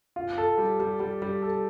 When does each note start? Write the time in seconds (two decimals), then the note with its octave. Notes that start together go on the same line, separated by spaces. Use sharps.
0.16 F4
0.38 A4
0.58 G3
0.80 G3
1.00 G3
1.22 G3
1.42 A4